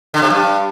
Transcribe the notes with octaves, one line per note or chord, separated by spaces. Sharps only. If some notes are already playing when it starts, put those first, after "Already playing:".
D3
C3
G2